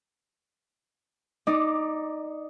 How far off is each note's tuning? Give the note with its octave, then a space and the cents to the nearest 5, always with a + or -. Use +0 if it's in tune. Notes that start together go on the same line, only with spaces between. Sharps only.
D#4 +0 D5 +20 D6 +0